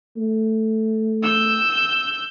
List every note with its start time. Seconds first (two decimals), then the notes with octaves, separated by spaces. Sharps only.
0.17 A3
1.22 E6 G6